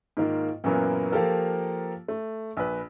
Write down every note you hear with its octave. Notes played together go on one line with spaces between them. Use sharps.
G#2 D#3 A#3 F4
F#2 A#2 E3 F#3 A#3 B3
F3 A#3 F4 G4 A4 A#4
A3
A#1 B4